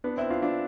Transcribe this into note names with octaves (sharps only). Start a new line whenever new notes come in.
B3 D4
C4 E4
D4 F4
D4 F4